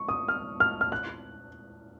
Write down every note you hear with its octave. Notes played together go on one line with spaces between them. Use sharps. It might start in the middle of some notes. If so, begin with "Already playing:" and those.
Already playing: C#6
D#6
F6
F6
F6
F#6